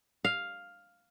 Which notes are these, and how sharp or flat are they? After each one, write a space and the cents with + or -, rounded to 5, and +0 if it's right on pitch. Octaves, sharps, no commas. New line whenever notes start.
F5 +5